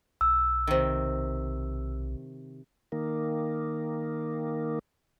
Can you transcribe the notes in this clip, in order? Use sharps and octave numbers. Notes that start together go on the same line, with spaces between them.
B1 E6
C3 D#3
D#3 A#3